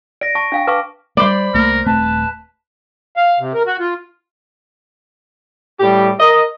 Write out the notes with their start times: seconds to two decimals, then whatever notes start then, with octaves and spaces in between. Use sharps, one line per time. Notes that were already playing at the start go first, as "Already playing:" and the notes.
0.21 D5 A#6 D7
0.35 A5 C#6
0.52 D4 F5 G5
0.67 B4 F5 A5 C#6 D6
1.17 G3 A3 C5 D5 B5
1.54 C2 A3 A#3 A#4
1.86 D#1 A3 C4 B4 A5
3.17 F5
3.40 C3
3.54 A#4
3.67 F#4
3.80 F4
5.80 A2 G3 G4
6.20 A#4 D#5